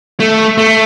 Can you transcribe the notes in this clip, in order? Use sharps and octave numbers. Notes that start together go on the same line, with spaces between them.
A3
A3